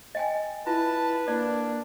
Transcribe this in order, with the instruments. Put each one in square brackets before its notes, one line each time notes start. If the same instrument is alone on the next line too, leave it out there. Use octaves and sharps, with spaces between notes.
[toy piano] D#5 G5 G#5
[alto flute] E4 [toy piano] F4 [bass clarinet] B4 [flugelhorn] A5
[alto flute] A#3 [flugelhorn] D4 [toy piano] D5